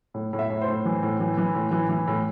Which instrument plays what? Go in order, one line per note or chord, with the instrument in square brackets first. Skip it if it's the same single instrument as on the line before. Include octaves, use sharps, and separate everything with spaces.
[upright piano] A2
A2
E5
A2
C5
A2
E3
A2
E3
E3
A2
E3
E3
A2